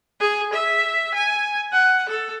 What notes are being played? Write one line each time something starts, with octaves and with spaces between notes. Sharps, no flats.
G#4
E5
G#5
F#5
A4